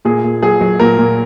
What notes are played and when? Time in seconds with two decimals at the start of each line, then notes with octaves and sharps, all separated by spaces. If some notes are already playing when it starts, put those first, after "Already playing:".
0.05 A#2 G#4
0.24 A#2
0.42 F#3 G#4
0.61 F#3
0.79 A#2 A#4
0.98 A#2